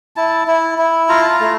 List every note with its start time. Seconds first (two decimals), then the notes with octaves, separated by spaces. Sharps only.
0.16 E4 A5
0.47 E4
0.78 E4
1.09 F4 A#5
1.22 A5
1.32 A#5
1.40 A3